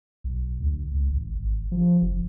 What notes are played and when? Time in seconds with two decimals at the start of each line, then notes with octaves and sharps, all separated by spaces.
0.24 B1
0.60 D2
0.91 C#2
1.10 A1
1.35 G#1
1.72 F3
2.02 F#1